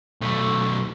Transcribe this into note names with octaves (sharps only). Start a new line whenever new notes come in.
B1 A3